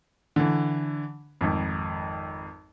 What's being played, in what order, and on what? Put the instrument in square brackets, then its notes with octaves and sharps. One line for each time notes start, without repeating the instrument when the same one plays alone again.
[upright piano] D3 E3
G#1 F2